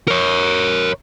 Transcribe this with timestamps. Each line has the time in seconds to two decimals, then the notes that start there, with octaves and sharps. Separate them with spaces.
0.08 A#4 C#5